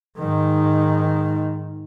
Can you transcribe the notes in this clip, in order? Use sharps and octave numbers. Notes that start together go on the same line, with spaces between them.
G#2 D#3